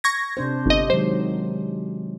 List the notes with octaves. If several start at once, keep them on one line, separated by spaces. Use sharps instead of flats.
C#6 G#6 A#6
C3 D4 C5
G1 D#5
D#3 F#3 G#3 C5